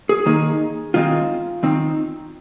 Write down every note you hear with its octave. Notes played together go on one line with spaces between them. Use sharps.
G#4
D#3 A#3 D#4 G#4
D#3 G#3 C4 F4
D#3 C4 D#4